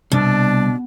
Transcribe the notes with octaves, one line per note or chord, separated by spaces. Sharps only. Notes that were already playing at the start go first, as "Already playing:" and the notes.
C2 B2 D4